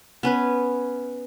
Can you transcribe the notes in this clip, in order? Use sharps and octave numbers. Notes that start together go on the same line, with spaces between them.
B3 C#4 B4